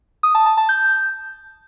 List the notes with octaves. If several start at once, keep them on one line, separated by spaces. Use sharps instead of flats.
D#6
A5
A5
A5
G6